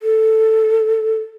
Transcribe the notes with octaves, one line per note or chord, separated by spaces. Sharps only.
A4